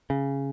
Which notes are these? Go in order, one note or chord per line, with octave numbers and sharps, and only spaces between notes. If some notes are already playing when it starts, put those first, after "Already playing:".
C#3